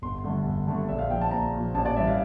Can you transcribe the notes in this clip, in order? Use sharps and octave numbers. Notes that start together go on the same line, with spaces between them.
G1 C6
G2 D3 A3
G1
G2 D3 A3
A#1 E5
F5
A#2 F3 G5
A5
A#1 A#5
A#2 F3
A1 A5
D5
G2 E3 E5
F5